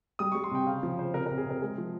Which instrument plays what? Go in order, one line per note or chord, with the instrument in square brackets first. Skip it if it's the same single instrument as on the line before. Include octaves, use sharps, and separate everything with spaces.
[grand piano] G3 D#6
G3 C#6
C6
C3 G5
C#3 F5
F3
C#3 C5
C3 A#4
A#4
C3
G#4
C3 A#4
G#3 G#4
F3